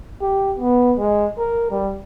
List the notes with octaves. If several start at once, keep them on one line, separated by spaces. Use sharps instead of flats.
G4
B3
G#3
A#4
G3